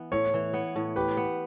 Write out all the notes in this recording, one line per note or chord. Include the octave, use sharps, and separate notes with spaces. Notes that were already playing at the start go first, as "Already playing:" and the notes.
Already playing: E3 B3
A2 C#5
E3
B3
A2
G4 B4
B3